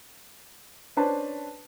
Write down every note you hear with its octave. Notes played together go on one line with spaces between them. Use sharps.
C#4 D4 B4 C5 A5